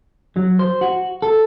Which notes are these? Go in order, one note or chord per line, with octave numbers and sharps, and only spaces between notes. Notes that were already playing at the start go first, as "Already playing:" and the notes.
F#3
C5
F#4
A4